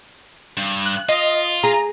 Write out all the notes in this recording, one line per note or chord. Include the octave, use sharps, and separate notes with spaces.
G2
F#6
F4 D#5
G#4 A#5